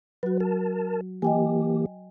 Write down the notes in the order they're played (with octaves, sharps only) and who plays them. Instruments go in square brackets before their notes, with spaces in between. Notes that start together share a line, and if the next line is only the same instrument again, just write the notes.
[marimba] F#3 F#4 [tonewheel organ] B4
[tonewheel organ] A#4 A5
[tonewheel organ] E3 A#3 G4 [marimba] D#5 G5 G#5